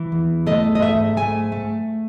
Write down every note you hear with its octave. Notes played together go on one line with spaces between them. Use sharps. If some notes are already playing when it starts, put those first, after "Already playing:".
Already playing: E3
E2
A3 D#5
D#5
G#2 E5
A3 G#5
A3